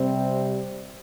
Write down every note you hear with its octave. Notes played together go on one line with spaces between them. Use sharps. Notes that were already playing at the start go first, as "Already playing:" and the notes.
Already playing: C3 G3 C4